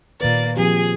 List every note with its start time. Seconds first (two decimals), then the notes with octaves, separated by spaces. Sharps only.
0.21 A#2 D#3 A#3 B4 D5
0.57 F3 C4 G4 G#4